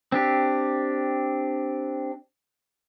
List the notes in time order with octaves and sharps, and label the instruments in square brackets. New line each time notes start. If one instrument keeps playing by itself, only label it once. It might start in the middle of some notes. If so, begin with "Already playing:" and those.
[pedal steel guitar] C4 D4 G4